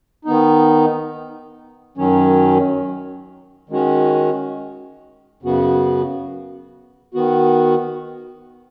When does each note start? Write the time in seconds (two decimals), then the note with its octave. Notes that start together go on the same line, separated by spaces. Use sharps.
0.25 D#3 B3 D#4
1.98 F#2 D#3 F#3 C#4
3.69 D#3 G#3 C#4 F#4
5.42 F#2 C#3 B3 F#4
7.14 D#3 B3 F#4